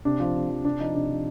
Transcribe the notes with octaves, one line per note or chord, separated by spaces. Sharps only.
C3 D4
F3
C3
F3
C3 D4
F3 D#4
C3 D4
F3